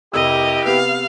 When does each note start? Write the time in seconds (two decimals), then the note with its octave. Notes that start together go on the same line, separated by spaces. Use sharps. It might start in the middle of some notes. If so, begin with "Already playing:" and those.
0.14 F1 E4 G4 A#4 D#5 D#6 E6
0.65 C3 B3 B4 F5